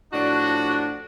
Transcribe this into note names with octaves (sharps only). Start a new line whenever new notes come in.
A2 F3 D4 F#4